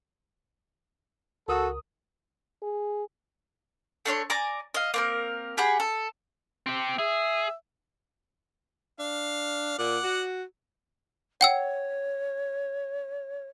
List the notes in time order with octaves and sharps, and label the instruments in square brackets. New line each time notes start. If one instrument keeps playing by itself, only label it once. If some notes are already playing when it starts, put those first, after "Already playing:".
[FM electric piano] C#2 A#4 D#6 [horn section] F#4 A4
[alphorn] G#4
[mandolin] A3 D4 C#5 C6
D5 G#5 A#5 D6
D#5 F5
A#3 C4 A#4
G4 G#4 F#5 B5
A4
[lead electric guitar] C4 G4
[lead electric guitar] G#4 [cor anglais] E5
[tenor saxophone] D4 [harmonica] F5
[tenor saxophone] A#2 [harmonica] D5 F#5
[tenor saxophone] F#4
[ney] C#5 [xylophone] F#5 G5 E6